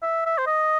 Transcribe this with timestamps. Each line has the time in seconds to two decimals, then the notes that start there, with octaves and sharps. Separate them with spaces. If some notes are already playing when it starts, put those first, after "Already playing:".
0.03 E5
0.26 E5
0.38 C5
0.47 D#5